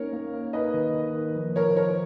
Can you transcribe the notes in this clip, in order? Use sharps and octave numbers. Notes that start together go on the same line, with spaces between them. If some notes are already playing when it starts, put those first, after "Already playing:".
Already playing: A#3 C#4 D#4 A#4 C#5
A#3
A#3
D#4 B4 D#5
D#3
D#3
D#3
F3
F3 A#4 C#5
F3 A#4 C#5